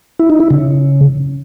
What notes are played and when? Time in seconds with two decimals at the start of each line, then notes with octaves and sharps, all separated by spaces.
0.19 E4
0.30 D#4
0.40 E4
0.50 C#3